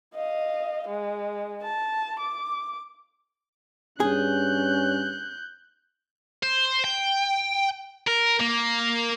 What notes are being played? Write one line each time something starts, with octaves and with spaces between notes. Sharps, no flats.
D#5 F5
G#3
A5
D6
G2 C#4 G#4 F#6 G6
C5
G5
A#4
A#3